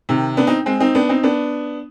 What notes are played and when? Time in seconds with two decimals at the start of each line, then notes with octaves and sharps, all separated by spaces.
0.09 C3 D#3
0.37 B3 D4
0.47 C4 D#4
0.66 G#3 C4
0.80 C4 D#4
0.95 B3 D4
1.09 C4 D#4
1.23 B3 D4